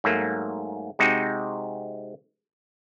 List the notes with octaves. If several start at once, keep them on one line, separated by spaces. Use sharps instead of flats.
G#2 F#3 A3 A#3
C3 G#3 C4 D#4 F#4